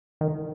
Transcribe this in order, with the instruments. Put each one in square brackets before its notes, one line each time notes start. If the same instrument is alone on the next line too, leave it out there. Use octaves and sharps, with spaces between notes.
[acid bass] D#3